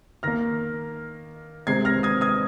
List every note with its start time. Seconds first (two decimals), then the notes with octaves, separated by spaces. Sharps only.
0.23 D#3 A#3 F6 A#6
1.67 C3 D#3 G#3 C4 G#6 C7
1.85 F6 A#6
2.03 D#6 G#6
2.21 D#6 G#6